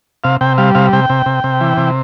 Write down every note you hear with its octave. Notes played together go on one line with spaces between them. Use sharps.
C3 F5
C3 G5
G3 F5
C3 F5
C3 G5
C3
C3
C3
E3
C3